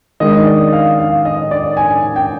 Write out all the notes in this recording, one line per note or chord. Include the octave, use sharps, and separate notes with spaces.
D#3 G#3 D4 D#5
D5
F5
F5
D#5
D5
G#5
G5